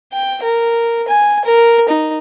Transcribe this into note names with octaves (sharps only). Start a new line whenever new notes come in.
G5
A#4
G#5
A#4
D#4